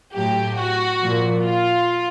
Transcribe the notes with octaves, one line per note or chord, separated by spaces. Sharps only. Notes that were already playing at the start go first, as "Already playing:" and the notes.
A2 F#3 G4
F#4
A#2 F3
F4